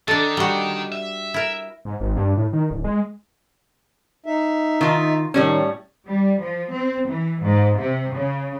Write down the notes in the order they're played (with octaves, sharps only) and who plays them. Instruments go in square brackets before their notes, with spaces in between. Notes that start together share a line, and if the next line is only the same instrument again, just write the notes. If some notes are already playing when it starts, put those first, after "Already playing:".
[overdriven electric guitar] D#3 [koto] D4 A4
[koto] G3 F#4
[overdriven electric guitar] E5
[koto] E4 A#4
[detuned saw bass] G#2
G#1
G2
A2
D#3
D1
G#3
[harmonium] D#4 E5
[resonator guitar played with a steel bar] D#3 F4
[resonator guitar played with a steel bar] A2 G3 C#4 [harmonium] D#3
[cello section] G3
F3
C4
E3
G#2
C3
C#3